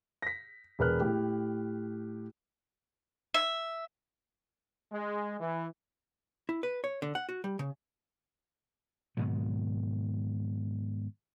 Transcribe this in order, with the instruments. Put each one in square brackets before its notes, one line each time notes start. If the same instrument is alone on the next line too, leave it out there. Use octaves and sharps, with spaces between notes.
[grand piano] A#6 B6
E1 A#4 B4 F6 F#6
A2 G4
[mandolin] E5
[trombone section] G#3
E3
[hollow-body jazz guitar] E4
B4
C#5
D3
F#5
F#4
G3
C#3
[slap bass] G#2 B2 D#3 F#3